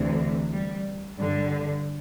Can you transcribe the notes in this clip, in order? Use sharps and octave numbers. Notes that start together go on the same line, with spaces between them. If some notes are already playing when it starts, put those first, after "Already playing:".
Already playing: D2 C3 E3
G3
G2 D3 G3